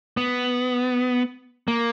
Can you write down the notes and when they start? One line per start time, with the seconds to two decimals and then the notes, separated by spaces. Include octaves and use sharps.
0.17 B3
1.68 A#3